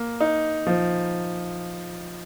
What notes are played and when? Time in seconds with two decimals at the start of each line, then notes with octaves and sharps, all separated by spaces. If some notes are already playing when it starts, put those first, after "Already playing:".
Already playing: A#3
0.20 D#4
0.67 F3